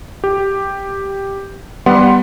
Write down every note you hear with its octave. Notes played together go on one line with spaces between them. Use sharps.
G4
G3 B3 F#5 C6